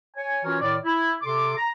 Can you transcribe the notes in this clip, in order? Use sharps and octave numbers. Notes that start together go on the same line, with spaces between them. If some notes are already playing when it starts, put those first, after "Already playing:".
C#5 G#5
E3 C#4 F4 F#4 A#4 C#5
A2 D#3 C#5 D5
E4
C3 A4 C6 D6
A#5